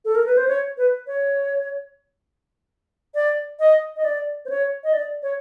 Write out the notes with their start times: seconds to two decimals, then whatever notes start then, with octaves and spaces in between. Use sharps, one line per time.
0.05 A4
0.15 A#4
0.26 B4
0.37 C5
0.48 C#5
0.77 B4
1.07 C#5
3.15 D5
3.59 D#5
3.96 D#5
4.05 D5
4.45 C5
4.50 C#5
4.84 D#5
4.93 D5
5.23 C#5